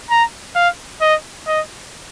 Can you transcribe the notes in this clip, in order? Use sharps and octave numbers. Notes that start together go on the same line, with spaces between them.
A#5
F5
D#5
D#5